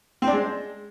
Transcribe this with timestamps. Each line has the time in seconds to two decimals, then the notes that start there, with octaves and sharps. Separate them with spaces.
0.22 C4
0.27 D4
0.33 G#3